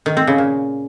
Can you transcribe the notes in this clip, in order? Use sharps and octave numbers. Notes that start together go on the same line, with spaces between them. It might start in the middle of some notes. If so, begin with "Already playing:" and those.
D#3
C4
C#3
A#2